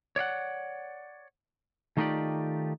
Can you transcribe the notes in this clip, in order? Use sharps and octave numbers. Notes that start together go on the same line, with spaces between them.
C#5 D5 F5 F#5
D#3 A3 D#4 F4 G4 D5